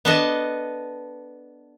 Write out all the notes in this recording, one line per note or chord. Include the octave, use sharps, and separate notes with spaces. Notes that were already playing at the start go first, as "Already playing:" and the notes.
B3 D4 A4 B4 D#5 A5